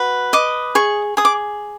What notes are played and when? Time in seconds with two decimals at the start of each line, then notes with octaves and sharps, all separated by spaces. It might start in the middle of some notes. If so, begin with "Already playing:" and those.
Already playing: F#4 B4
0.33 D#5 D6
0.75 G#4 C#6
1.17 G#4 D#6
1.25 D6